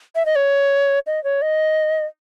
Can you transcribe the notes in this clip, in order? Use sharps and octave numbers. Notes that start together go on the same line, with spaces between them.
E5
D#5
C#5
D#5
C#5
D#5